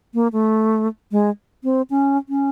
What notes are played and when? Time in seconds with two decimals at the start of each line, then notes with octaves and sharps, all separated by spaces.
0.14 A#3
0.33 A3
1.12 G#3
1.64 C4
1.90 C#4
2.29 C#4